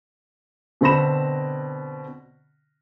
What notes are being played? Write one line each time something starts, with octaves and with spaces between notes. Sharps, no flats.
B2 D3 C4 B5 A#6 E7